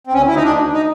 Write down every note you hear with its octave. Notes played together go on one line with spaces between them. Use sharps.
C4
D2 C#4
D2 E4
D#4
D2 D4
D2
D#4